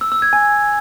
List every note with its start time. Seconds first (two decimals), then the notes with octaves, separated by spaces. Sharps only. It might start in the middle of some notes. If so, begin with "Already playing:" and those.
0.01 E6
0.12 E6
0.22 G#6
0.33 G#5